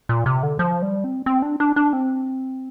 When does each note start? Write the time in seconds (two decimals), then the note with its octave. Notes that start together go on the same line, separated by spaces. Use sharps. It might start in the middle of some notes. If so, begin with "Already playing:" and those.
0.09 A#2
0.26 C3
0.43 D3
0.59 F3
0.82 G3
1.04 C4
1.26 C4
1.42 D4
1.60 D4
1.76 D4
1.93 C4